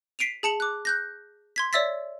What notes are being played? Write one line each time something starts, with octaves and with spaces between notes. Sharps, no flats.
B6 C7 D7 D#7 F7
G#4 A5 C#7 F#7
D6 F#6
F#6 G6 A#6
C6 G#6 B6
C#5 D5 E5 E6 A6 B6